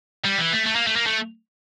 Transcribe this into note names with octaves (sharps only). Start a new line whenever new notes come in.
G3
E3
A3
A3
A#3
A3
A#3
A3